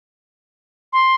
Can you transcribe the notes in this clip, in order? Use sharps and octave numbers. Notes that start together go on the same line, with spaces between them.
C6